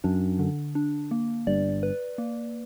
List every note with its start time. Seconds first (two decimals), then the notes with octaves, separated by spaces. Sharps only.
0.04 F#2 D4
0.39 D3
0.75 D4
1.11 A#3
1.47 G1 G2 D5
1.83 B4
2.18 A#3